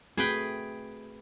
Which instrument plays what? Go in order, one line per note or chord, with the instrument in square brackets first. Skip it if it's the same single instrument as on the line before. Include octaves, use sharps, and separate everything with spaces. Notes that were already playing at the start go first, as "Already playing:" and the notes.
[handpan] A3 C4 F#4 [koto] G#4 B4 G5